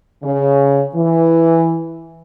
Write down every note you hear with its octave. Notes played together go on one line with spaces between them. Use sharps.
C#3
E3